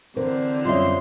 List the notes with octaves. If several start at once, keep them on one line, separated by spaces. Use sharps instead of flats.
D3 E3 C4 A#4 C5
F#2 G3 F4 D#5 E5 C6